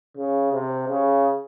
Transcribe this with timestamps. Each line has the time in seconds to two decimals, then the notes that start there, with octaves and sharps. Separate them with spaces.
0.17 C#3
0.53 C3
0.89 C#3